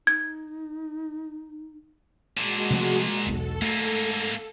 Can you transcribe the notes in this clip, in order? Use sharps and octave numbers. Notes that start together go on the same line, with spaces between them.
D#4 G#6
A#2 G#3 D4 F#4
C3 F3 A3
E1 B1 A4
G#2 A3 A#3